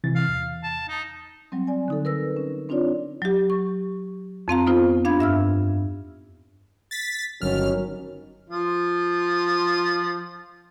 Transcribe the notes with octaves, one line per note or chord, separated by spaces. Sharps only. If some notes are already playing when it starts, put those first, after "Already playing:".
C3 E3 A6
F5
E2
A5
D#4
F#3 G3 C4
D5 G#5
D3 D#4 A4
A#4 B4 E6 A#6
C#4
C4 D4 D#4 F4 C#5 D5
F#3 G4
C#6
F2 C4 F5 A#5
B3 D#4 F4 C5
D4 F5 B5 G#6
G2 E5 E6 F6
A6 B6
G1 D#3 F#3 C#4 F6
F3 F4